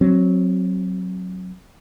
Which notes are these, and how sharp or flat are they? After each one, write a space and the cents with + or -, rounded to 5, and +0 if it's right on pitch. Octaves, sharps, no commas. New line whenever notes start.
F#3 +0 C4 +20